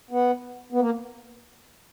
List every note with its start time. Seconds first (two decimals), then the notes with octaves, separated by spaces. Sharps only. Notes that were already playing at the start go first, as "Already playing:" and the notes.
0.11 B3
0.72 B3
0.80 A#3